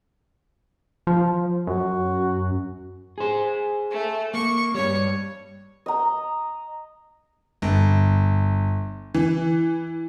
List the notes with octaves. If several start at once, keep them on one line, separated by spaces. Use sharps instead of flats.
F3
F#2 F#4
G#4 C5
A3
A#3 C#6
G2 G3 C#5
D#5 A#5
G1
E3